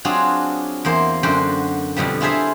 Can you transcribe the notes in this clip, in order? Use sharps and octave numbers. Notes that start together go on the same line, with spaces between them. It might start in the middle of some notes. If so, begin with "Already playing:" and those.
F#3 C4 D4 F4 F#4 G#4
E2 A#3 C5
F#2 D3 F#4 C5 G5
F2 B2 D3 F3 G3
E4 F4 G#4 A4 C5 E5